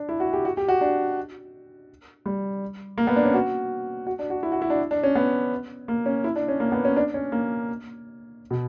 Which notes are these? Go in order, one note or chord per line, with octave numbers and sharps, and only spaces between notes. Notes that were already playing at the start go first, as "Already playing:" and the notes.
Already playing: D4
E4
F#4
G4
F#4
G4
F#4
D4
G3
A#3
B3
D4
C#4
F#4
F#4
D4
F#4
E4
F#4
E4
D4
D4
C#4
B3
A#3
C#4
E4
D4
C#4
A#3
B3
C#4
D4
C#4
A#3
B2